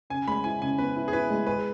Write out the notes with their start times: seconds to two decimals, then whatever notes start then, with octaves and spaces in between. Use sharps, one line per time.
0.10 C#3 G#5
0.27 G#3 B5
0.44 E4 G#5
0.61 C#3 G#5
0.78 B3 B4
0.96 E4
1.08 G#4
1.13 E4 B4
1.30 G#3
1.46 G#4 B4